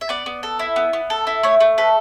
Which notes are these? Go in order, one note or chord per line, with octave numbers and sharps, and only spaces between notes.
E5
B3 D5
B3
A4
E4
B3
B3
A4
E4
A3 C#5
A3
A4 B4